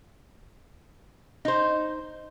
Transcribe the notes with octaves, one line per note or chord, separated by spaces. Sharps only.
D#4 C5